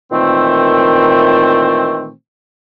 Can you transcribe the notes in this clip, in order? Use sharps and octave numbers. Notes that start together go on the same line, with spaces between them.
A#2 D#3 E3 A3 C4